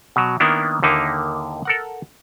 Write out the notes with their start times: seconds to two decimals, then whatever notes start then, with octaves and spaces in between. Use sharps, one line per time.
0.16 B2 F#3
0.40 D#3 A#3 B3 D4 E4
0.82 D#2 D3 A#3 D#4 E4
1.65 A4 A#4 F#5